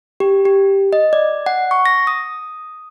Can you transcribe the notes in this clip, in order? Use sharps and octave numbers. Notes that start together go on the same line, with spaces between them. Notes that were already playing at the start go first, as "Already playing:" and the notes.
G4
G4
D#5
D5
F#5
C#6
A#6
D#6